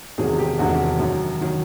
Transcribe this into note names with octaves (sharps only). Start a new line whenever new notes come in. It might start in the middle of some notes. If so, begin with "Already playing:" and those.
E1 E2 C3 D#3 F#3 G#4
G4
E1 E2 C3 D#3 F#3 F#4
F#2 D#3 F#3
D#3 F#3